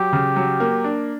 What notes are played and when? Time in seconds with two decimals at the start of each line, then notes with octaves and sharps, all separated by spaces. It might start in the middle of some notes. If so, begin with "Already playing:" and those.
Already playing: F#3 G4
0.13 C#3
0.36 F#3
0.60 A#3
0.84 D4